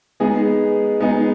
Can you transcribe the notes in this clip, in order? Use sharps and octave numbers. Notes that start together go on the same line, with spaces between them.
G#3 B3 D#4 G#4
G#3 B3 D#4 G#4